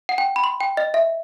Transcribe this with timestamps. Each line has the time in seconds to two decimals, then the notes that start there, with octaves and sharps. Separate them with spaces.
0.09 F#5
0.18 G5
0.36 B5
0.44 C6
0.61 G5
0.77 D#5
0.94 E5